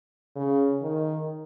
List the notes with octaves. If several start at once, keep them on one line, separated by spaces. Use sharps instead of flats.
C#3
D#3